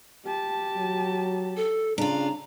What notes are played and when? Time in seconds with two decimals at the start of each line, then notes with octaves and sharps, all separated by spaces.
0.25 G4 A5
0.77 F#3
1.57 A4
1.98 C#3 D4 F4 A#5